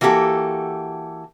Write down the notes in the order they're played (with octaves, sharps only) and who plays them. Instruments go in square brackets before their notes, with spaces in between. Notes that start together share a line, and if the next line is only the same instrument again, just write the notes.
[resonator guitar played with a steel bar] E3 A#3 F#4 G4 A4